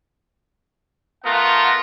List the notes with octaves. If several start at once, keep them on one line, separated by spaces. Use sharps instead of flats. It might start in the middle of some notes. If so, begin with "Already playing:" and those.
A3 B3 F4 A#4 F#5